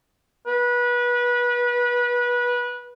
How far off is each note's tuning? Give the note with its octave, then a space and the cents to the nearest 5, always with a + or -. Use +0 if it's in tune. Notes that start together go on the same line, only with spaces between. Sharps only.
B4 -25